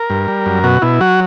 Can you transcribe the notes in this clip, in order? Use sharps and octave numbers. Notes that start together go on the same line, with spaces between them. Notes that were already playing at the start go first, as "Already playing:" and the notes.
Already playing: A#4
G2
G3
F#2
B2 F#4
B2 E4
F#3 F#4